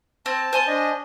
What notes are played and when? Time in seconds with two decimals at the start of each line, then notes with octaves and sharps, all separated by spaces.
0.26 C4 A5
0.53 C5 G#5 A5 C6
0.68 D4 D#5